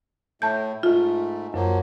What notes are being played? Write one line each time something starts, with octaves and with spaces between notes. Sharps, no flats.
A2 A3 A5 G6
G#2 A3 F4
F#2 F3 F#3 A#3